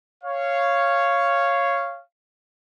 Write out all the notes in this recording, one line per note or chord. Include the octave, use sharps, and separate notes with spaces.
C#5 F5